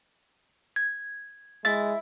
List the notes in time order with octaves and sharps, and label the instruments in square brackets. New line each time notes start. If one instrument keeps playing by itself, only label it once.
[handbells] G#6
[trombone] G#3 [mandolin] E4 [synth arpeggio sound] A6